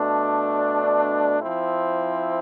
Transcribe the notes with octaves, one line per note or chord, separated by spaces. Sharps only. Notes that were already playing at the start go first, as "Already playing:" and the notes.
Already playing: B2 A3 D4
F3 C4 E4